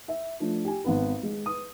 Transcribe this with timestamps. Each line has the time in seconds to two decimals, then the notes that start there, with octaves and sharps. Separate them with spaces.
0.08 E5
0.40 F3 A3 D4
0.65 G4 G#5
0.84 G#1 B3 B4
1.23 G#3
1.46 B4 D#6